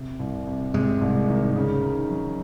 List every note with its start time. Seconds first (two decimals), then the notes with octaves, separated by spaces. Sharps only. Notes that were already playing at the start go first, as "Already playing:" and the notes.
Already playing: C3
0.19 C2
0.47 C3
0.74 G#2 C3 G#3
1.01 C2
1.28 D#3
1.56 C#3
1.82 D#4
2.10 F#3